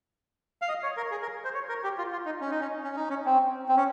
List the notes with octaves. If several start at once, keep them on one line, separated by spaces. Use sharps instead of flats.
F5
D#5
C#5
A#4
G#4
A#4
C5
C#5
A#4
G4
F4
F4
D#4
C#4
D#4
C#4
C#4
D#4
C#4
C4
C4
C#4